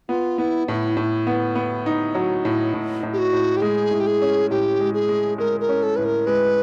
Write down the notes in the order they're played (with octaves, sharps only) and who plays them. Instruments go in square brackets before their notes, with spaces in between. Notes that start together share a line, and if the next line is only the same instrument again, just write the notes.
[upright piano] B3 [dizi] F4
[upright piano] B3 [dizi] E4
[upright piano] A2 [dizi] E4
[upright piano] A2
B3
B3
D#4
F#3
A2
A2
A2
[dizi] G4
F#4
[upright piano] A2
[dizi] G4
[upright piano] G#3 [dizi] G#4
[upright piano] A2
[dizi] G4
G#4
[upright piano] C#4
[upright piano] A2 [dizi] G4
[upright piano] G#3
[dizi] G#4
[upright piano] G#3
[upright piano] G#3 [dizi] A#4
[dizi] A#4
[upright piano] C#4
[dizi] A4
[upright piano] A2 [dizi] B4
[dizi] A#4
[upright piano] G#3 [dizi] B4